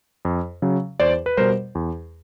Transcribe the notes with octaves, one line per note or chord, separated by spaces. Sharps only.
F2
C#3 F#3
E2 C5 D5
B4
B2 G3 A#4 C5
E2